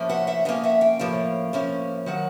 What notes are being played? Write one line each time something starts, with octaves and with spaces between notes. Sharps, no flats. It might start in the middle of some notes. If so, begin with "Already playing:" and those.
Already playing: A2 F3 A#3 C#4
E5 F#5
E5 F#5
A2 F3 A#3 C#4 D#5 F5
E5 F#5
F5 G5
A2 F3 A#3 C#4
A2 F3 A#3 C#4
D#3 F#3 F#5